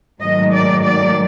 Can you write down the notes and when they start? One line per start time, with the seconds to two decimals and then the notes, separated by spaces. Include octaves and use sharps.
0.22 G#2 D#3 F#3 A3 D#5
0.53 D5
0.84 D5